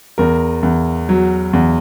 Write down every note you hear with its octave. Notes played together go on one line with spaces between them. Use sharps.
E2 A#4
E2
F#3
E2